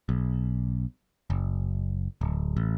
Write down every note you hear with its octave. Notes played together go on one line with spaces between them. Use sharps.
B1
F#1
D1
A1